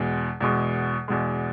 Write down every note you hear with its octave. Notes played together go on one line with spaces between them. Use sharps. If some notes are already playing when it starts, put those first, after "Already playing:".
Already playing: E2 B2 G#3
E2 B2 G#3
E2 B2 G#3